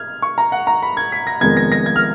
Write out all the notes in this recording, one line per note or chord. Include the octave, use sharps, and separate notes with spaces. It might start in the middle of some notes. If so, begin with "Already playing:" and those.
Already playing: F6 G#6
C#6
A#5
F#5
A#5
B5
G#6
B6
A#6
F1 F2 D#3 G#3 B3 G#6
A#6
A#6
G#6
F6